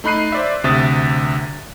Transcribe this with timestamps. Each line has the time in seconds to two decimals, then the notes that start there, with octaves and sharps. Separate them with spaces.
0.04 A3 D#4 B5 F#6 C7 D#7
0.32 C5 D5 E5
0.64 D2 C3 E5 D#6 F#6 A6